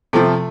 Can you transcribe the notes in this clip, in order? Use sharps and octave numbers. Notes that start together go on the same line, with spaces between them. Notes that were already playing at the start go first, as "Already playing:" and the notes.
C3 F3 A3